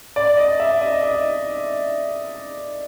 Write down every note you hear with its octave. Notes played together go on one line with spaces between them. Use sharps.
D5
D#5
E5
D#5
D#5